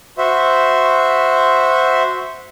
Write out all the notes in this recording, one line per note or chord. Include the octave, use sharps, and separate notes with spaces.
F#4 C5 E5